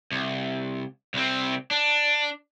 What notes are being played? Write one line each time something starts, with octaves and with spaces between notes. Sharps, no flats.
C2
C2 C4
D4